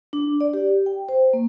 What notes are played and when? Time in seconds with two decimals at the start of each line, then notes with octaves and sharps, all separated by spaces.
0.13 D4
0.41 D5
0.53 G4
0.86 G5
1.09 C5
1.33 A#3